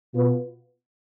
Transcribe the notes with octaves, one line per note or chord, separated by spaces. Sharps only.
B2 B3 F4 B4